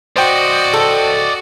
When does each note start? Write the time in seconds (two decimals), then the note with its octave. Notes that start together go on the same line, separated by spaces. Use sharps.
0.16 F#4 C5 D5 D#5 G5
0.73 A4